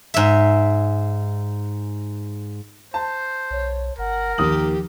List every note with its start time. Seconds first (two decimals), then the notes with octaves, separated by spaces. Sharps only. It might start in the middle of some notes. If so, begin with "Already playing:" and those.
0.14 G#2 E5
2.94 C5 A5
3.51 B1 C#5
3.98 G1 A#4 F#5
4.38 D#2 F3 G4 D#6 F#7